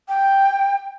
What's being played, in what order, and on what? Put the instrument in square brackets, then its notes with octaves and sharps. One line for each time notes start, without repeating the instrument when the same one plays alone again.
[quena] G5